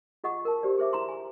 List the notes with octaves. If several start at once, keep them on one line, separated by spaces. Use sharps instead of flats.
F4 G#4 D#5 F#5 C#6 D#6
A#4 A5
G4 C5 D5
G#4 C5 E5 D6
E4 A#5 C6
G#5